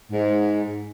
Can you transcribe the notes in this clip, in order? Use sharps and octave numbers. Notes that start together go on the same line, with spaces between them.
G#2